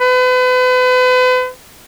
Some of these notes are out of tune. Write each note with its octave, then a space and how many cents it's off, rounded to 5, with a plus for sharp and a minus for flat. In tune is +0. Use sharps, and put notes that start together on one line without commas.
B4 +40